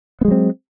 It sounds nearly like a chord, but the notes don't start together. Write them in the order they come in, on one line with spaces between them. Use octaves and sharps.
B3 G#3 F#3 C4